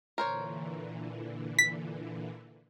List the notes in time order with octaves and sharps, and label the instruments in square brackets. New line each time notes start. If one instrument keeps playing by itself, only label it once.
[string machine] A#2 D3 E3 [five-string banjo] A#4 C5 C#5
[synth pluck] B6